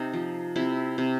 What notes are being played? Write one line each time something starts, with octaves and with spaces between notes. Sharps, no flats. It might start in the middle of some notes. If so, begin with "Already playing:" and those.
Already playing: C3 D#4
F3
C3 E4
C3